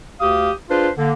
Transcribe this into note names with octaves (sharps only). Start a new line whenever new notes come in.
D2 G4 F5 D#6
D4 F4 G#4 B4 C5
D3 A#3